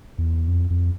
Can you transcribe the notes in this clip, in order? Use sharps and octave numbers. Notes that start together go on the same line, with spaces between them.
E2
F2
F2